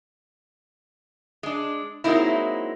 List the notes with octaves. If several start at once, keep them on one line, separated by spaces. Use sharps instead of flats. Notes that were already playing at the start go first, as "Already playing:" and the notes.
G#3 D4
F#3 G#3 A#3 C4 D#4 E4